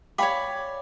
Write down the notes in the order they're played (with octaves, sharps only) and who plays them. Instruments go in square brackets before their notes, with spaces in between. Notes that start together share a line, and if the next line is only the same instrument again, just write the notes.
[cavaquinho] C#5 D5 B5 [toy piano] F5 G5 D6